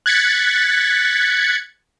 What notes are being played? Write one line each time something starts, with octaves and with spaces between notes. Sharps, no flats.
F#6 G#6 A6 B6 C#7